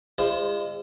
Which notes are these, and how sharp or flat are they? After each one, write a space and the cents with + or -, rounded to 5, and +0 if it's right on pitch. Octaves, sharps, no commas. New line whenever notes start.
G#3 -40 F4 -45 C5 +0